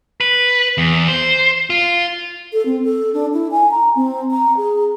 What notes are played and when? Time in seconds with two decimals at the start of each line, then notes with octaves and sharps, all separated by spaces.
0.21 B4
0.78 E2
1.08 C5
1.70 F4
2.53 A4
2.66 C4
2.84 A4
3.14 D4
3.34 E4
3.51 G#5
3.71 A#5
3.96 C4
4.31 A#5
4.57 G#4